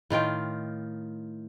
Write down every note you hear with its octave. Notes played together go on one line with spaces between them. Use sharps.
A2 D#3 F4 G5